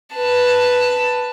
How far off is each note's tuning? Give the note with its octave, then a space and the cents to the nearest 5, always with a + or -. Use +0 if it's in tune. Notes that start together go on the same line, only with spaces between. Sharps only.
B4 +0 A5 +10